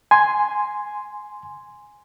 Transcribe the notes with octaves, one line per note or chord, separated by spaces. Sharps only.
G#5 C6